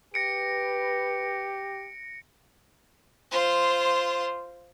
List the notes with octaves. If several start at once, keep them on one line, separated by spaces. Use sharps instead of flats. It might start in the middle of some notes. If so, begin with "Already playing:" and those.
G4 B4 A#6 C#7 D7
F4 C5